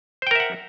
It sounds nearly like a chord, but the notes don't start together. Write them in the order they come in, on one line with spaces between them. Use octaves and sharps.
C5 G5 A#4 E5 F#5